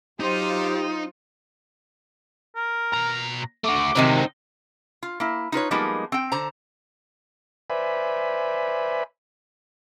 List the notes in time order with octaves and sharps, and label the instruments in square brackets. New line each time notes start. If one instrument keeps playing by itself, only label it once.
[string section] F#3 F4 C5 [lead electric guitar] D#4 [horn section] G4
[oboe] A#4
[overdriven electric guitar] B2 A#5
[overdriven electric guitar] A3 F#4 [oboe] D6
[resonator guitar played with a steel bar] C3 D#3 F#3 [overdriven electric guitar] C4 D#4
[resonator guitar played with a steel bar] F4
A#3 E4
D#4 F4 B4 C#5
F3 G3 G#3 A#3 B3 D#4
C4 G5
D3 C5 A#5
[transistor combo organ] B4 C5 D5 E5 G#5 B5